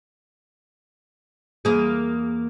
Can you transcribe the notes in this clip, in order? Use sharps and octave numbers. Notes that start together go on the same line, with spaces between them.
E2 A#3 G#4